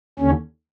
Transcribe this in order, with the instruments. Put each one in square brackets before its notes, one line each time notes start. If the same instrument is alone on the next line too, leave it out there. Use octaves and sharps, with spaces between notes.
[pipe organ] D#2 D3 C#4